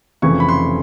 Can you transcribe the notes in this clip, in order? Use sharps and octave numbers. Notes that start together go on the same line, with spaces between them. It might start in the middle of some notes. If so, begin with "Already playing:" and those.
F1 F2 C#3 E3 C#6
B5
C6